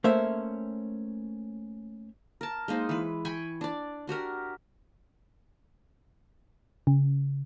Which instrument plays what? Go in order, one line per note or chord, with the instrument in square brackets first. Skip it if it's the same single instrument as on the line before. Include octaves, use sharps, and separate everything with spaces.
[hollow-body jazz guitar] A3 A#3 C#4 C5 E5
[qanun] A#4 A5
G#3 A#3 D#4 C5
E3 B4
G5 G#5 B5 C#6
D4 D5
D4 F#4 G4 A#4
[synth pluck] C#3